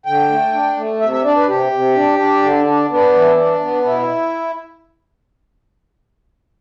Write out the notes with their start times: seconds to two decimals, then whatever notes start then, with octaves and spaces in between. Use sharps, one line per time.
0.06 D3 G5
0.29 A3
0.53 D4
0.76 A3
1.00 C3 E5
1.12 E5
1.24 D4 D5
1.37 B4
1.48 C3 G4
1.72 C3
1.95 D4
2.19 D4
2.43 D3
2.66 D4
2.90 B3 D4
3.14 E3
3.38 D4
3.61 B3
3.85 B2 E4